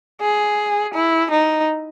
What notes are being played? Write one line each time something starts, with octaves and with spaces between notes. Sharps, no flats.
G#4
E4
D#4